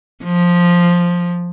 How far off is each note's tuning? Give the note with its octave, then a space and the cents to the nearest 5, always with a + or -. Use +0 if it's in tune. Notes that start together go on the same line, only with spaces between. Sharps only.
F3 +5